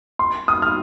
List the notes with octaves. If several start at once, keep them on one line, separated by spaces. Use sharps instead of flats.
C6
D#6
F6